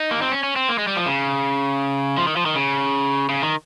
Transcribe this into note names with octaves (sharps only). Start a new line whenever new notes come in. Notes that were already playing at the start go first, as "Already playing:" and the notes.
Already playing: D#4
A#3
C4
C#4
C#4
C4
A#3
G#3
G3
F3
C#3
F3
D#3
F3
D#3
C#3
C#3
D#3